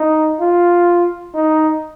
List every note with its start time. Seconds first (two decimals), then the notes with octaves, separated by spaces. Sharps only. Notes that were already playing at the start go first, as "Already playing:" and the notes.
Already playing: D#4
0.40 F4
1.35 D#4